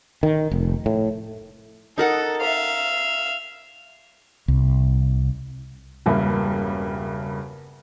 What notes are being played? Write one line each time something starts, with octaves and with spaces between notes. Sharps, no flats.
D#3
F1
A2
D#4 A4 A#4 F#5
E5 F5
C2
E1 G2 C#3 A#3 E4 B5